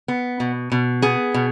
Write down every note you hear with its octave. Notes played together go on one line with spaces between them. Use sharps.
B3
B2
B2
B3 G#4
B2